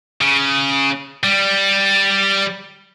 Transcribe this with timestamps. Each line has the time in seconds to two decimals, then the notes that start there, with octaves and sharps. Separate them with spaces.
0.21 C#3
1.24 G3